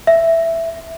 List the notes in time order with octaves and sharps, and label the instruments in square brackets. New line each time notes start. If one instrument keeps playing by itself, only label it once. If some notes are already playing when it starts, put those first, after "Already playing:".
[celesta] E5